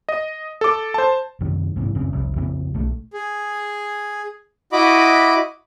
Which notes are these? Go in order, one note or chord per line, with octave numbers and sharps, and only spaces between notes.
D#5
A4 D6
C5 A5
F#2 C3 D#3
G#2 C3 E3
D1 F#2 C#3 C4
F1 C2
F2 C#3 E3 C4
B1 A3
G#4
E4 F#4 D#5 B5 D6